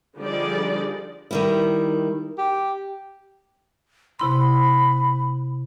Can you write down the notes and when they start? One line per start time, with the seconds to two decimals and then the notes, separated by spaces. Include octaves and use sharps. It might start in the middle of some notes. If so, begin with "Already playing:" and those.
0.17 D3 F3 G3 D#4 G#4 D5
1.31 D#3 G3 E4
2.38 G4
4.19 C3 E4 B5 C6